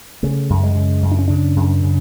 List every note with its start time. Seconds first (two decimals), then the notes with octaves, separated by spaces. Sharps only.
0.23 C#3 A3
0.50 F#2
0.63 G#3
0.76 C#3
1.03 F#2
1.11 D4
1.19 C#4
1.28 C#3 D4
1.56 F#2
1.83 C#3